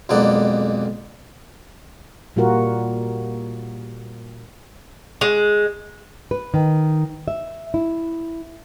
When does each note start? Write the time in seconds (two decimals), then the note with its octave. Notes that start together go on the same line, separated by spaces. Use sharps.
0.09 B1 F2 G#3 A#3 D5 F#5
2.36 A#2 G3 A#3 F4 F#4 A#4
5.21 G#3
6.31 B4
6.54 D#3
7.28 E5
7.74 E4